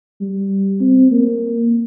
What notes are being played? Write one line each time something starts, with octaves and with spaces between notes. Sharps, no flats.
G3
C4
A#3